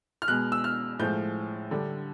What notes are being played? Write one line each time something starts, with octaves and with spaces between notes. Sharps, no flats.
F6
B2 G#3 F#6
E6
F6
A2 F3 G#3 G6
D3 G3